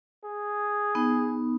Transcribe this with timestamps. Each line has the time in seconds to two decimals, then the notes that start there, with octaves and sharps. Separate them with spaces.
0.24 G#4
0.95 B3 D#4